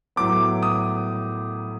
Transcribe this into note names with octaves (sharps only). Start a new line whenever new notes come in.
A2 F#3 B3 D6
D#6